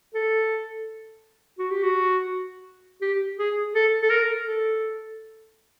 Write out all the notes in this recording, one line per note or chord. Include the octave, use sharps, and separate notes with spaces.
A4
F#4
G4
F#4
G4
G#4
A4
A4
A#4
A4